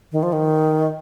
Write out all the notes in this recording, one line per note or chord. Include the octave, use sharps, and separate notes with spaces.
D#3
F3
D#3